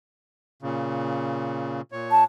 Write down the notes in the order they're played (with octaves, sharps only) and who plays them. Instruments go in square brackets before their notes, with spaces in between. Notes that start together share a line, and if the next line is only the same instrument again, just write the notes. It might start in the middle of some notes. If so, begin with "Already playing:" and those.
[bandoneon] A#2 C#3
A#2 C#5
[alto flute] A5